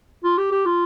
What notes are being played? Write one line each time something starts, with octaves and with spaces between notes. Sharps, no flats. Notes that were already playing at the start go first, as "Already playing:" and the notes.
F4
G4
G4
F4